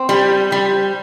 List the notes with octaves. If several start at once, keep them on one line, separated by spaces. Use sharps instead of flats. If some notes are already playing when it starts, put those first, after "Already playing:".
Already playing: C4
G3
G3